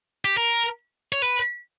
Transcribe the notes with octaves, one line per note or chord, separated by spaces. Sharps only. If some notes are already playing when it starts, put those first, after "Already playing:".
G4
A#4
C#5
B4